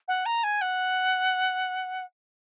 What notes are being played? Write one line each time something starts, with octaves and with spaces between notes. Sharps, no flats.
F#5
A#5
G#5
F#5